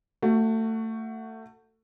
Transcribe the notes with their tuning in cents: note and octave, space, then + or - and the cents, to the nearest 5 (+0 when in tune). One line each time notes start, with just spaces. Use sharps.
A3 +25 F#4 +0